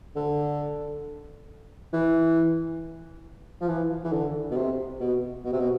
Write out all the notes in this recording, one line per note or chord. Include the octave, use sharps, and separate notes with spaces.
D3
E3
F3
E3
E3
D3
B2
C3
B2
B2
C3
B2